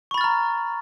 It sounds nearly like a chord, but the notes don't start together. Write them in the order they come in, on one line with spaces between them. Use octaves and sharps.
C#6 B5 A6 F6 A#5